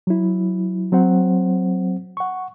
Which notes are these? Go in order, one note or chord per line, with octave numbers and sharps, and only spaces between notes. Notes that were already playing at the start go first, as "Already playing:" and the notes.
F#3 E4
F#3 C4 C5 F#5
F#5 C#6